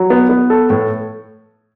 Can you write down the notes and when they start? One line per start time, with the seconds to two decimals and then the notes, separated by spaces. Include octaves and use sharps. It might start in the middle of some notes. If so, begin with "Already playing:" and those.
Already playing: F#3
0.10 B3
0.30 B3
0.50 A4
0.70 A2